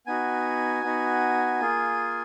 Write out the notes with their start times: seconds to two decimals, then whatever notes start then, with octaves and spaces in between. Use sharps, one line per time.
0.07 B3 D#4 F#4 G#5
0.83 B3 D#4 F#4
1.60 A#3 F4 G#4